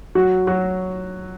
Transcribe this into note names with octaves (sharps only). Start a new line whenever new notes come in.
F#3 F#4
F#3 F#4